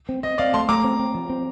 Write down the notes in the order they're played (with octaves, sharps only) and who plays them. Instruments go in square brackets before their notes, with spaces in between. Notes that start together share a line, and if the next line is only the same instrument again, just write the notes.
[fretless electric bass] C4
[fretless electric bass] C4 [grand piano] D#5
[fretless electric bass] C4 [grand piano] D5 F5
[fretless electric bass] A3 [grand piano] A5 C6
[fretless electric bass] A3 [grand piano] A#5 D6
[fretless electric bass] C4
C4
F3
C4